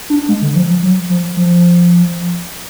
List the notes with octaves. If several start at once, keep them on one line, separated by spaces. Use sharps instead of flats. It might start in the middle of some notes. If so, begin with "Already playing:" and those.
D4
G#3
D3
F3
F3
F#3
F3
F3